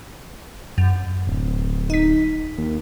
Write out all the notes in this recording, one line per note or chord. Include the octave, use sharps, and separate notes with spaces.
F#2
D1
D#4 B6
D#2